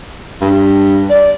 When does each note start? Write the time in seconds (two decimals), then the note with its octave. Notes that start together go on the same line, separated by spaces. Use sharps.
0.41 G2
1.10 D5